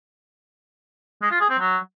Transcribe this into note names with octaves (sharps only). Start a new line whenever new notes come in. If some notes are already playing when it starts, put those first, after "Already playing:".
G#3
F4
G#4
C4
F#3